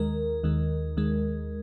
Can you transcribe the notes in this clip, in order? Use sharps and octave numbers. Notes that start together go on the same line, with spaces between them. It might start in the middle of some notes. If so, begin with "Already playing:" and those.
Already playing: D#2 D#3 G#3 A#4
D#2 D#3 G#3
D#2 D#3 G#3